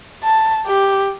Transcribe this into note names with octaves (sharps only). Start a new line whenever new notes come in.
A5
G4